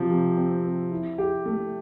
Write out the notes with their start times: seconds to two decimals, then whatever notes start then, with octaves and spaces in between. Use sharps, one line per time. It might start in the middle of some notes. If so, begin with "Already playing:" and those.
Already playing: C3 F3
0.10 C3
0.37 C4
0.65 C3
0.91 E4
1.18 G4
1.46 A3